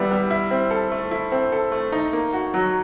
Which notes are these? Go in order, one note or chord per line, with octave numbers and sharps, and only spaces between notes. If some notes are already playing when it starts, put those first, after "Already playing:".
Already playing: G3 B3 E4
G3
E4
C4
A4
A3
E4
C4
A4
A3
D#4
A#3
F#4
F#3